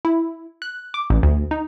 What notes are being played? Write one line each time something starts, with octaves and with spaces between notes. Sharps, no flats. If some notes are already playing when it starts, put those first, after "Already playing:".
E4
F#6
D6
A1
D2
D#4